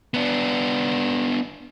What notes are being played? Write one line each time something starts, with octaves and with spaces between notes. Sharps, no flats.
B3 D4